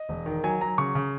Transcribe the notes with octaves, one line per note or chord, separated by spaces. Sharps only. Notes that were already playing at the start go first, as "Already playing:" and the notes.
Already playing: D#5
E1
D#3
F#3 G#5
F#3 A#5
C#3 C#6
C#3